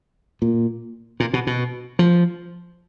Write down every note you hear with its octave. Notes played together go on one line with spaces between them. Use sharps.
A#2
A#2
B2
B2
F3